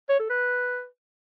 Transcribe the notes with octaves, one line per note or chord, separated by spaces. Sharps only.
C#5
A4
B4